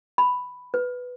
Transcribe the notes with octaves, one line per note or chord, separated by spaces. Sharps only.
B5
B4